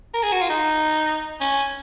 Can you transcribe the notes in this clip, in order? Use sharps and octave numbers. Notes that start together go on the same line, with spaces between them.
A#4
G#4
F#4
F4
D#4
C#4